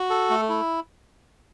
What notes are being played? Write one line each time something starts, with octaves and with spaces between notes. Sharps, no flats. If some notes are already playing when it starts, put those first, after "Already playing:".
Already playing: F#4
A4
A3
E4